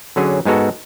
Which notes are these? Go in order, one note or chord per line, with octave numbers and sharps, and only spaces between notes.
D3 F#3 C#4 G#4
G#2 G#3 B3 F#4 A4